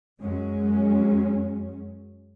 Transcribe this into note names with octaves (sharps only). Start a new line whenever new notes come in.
F#2 F#3 G#3 C#4